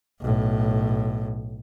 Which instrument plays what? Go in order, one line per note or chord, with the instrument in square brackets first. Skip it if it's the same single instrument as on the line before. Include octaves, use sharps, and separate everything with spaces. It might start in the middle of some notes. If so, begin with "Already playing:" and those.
[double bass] B1 A2